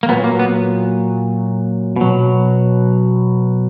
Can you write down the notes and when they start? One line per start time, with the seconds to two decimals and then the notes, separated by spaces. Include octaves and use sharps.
0.03 A#3
0.09 A#2 F#3 B3
0.24 A#3
0.39 B3
1.96 B2 F#3